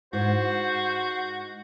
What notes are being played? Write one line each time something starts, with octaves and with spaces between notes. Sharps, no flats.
G#2 F#4 C5